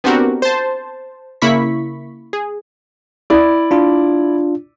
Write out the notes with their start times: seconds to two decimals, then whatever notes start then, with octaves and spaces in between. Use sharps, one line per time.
0.04 B3 C4 D4 F#4 G4 A#4
0.42 C5 A5
1.42 C#3 A#3 E4 B5 C#6 B6
2.33 G#4
3.30 E4 D5
3.71 D4 F4